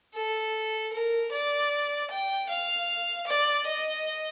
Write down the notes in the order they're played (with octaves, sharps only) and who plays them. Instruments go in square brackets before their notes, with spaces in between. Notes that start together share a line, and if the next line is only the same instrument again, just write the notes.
[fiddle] A4
A#4
D5
G5
F5
D5
D#5